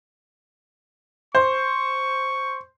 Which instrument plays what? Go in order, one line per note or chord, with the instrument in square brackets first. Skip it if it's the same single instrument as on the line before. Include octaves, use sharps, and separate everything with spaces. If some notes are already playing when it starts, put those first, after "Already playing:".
[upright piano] C5 [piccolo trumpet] C#6